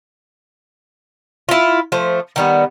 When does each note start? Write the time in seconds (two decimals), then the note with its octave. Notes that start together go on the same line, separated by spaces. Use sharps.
1.49 E4 F4
1.92 F3 A3 C5
2.36 D#3 G3 B3